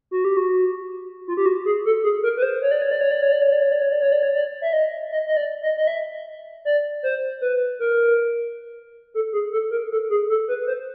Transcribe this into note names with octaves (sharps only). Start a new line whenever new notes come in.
F#4
G4
F#4
F4
G4
F#4
G#4
A4
G#4
A#4
B4
C5
C#5
D5
C#5
D5
C#5
D5
C#5
D5
C#5
D5
C#5
D5
C#5
D5
C#5
D5
C#5
D5
E5
D#5
D#5
D#5
D5
D#5
D#5
E5
D5
C5
B4
A#4
A4
G#4
A4
A#4
A4
G#4
A4
B4
C5